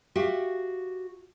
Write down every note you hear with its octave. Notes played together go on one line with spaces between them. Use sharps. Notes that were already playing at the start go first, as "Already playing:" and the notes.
F#4 G4 E5 F5